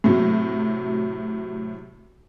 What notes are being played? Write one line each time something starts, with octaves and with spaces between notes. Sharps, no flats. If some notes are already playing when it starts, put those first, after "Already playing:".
A2 C3 F#3